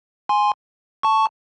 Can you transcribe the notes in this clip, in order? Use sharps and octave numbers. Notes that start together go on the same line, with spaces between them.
G#5 C6
A5 C#6